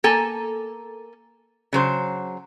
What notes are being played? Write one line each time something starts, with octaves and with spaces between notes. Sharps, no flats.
A#3 A4 G#5 A#5
C#3 F#3 C5